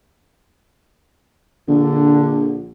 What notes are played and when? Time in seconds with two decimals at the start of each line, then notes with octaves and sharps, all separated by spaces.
1.68 A#1 D3